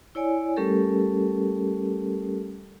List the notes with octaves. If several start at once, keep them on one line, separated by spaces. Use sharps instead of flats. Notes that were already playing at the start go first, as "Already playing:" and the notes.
E4 C#5 D5 G#5
G3 A3 C#4 G4 A4 A#4